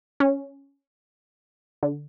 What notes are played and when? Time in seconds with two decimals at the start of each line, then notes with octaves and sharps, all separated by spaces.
0.20 C#4
1.83 D3